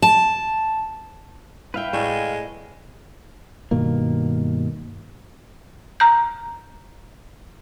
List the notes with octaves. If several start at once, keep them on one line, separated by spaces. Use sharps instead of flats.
A5
E4 B4 E5 F5 G5
A2 G#3 A3 D5
G2 B2 D#3 A#3
A#5 G6